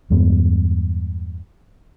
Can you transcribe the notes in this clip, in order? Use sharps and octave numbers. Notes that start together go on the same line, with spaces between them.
E2 G2 G#3 B3